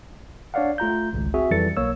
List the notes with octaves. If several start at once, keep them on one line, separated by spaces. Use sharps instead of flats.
D4 C#5 D5 F5 F#5
A3 F4 A#5 G6
G#1 C#2
C4 F#4 G#4 E5
F2 E3 G3 A4 A6 C#7
B1 A#3 C#5 E6